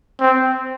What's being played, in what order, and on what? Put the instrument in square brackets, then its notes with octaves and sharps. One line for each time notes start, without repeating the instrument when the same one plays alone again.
[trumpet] C4